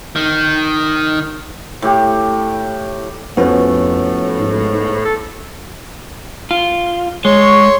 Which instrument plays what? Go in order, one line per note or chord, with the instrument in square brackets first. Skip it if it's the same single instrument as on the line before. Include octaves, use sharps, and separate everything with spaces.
[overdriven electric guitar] D#3
[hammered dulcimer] A2 G4
[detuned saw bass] F2 [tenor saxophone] A2 [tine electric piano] F3 C#4 F#4 [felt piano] B3
[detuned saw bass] G#2
[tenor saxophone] A4
[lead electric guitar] F4
[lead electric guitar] G#3 [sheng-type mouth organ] C#5 C6 C#6